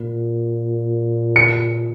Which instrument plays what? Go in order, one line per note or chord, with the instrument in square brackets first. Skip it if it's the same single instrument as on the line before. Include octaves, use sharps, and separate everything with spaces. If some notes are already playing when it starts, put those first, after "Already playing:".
Already playing: [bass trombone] A#2
[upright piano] C#7